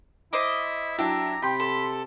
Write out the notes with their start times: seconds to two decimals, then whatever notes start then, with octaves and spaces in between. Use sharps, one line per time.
0.33 E4 C5 D#5 D6
0.99 F#3 D4 E4 G4 A#5
1.42 C3 G5 B5 C6
1.60 A4 C6